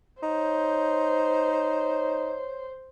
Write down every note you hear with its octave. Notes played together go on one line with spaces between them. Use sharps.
D#4 C5 C#5